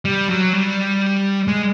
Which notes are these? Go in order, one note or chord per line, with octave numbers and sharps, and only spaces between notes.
G3
F#3
G3
G#3